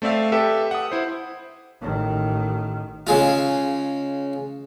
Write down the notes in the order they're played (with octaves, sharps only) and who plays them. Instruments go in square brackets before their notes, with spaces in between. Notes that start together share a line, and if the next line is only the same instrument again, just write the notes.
[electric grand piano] A3 C4 D5 E5 F5
G4 A4 B4 E5
F#5 D#6
E4 C5
[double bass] A1 D#3
[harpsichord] C#3 G#3 F4